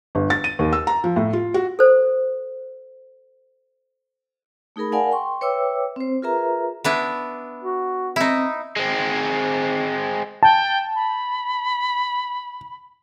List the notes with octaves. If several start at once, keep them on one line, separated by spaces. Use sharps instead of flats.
G1
A6
D#7
D#2
E6
A#5
F3
A2
F4
F#4
A4 C5
A3 D#4 G#4 A#4 B5
A#4 D5 F5 F#5 G#5 A5
G5 C6 C#6
B4 C#5 E5 G5 D6 E6
C4 C5
F4 G#4 A#4 B4 E5 A#5
B3 D4 E4
F#4
C4 D#4 E4
G#3 C4
G5 A5
B5